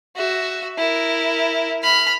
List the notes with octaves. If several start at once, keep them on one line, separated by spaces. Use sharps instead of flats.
F#4 E5
E4 A#4
B5 F6